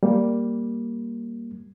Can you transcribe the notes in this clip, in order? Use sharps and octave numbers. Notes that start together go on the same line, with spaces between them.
G3 A#3